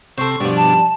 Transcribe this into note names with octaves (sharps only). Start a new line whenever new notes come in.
C3 A4 C5 C6 C#6
G2 B2 F3 D4
A5